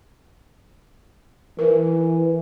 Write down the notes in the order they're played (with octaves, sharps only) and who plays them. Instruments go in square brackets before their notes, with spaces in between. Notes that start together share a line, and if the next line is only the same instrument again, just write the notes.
[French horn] E3 [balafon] A#4